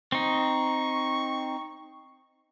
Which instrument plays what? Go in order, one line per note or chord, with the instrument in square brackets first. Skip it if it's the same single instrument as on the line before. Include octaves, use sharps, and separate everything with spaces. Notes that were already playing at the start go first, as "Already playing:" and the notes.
[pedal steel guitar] C4 D#4 [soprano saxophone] C#6